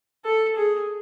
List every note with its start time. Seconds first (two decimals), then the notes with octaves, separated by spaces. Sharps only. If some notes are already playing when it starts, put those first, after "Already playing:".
0.25 A4
0.56 G#4